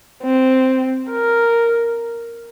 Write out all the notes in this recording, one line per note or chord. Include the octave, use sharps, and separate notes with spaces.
C4
A#4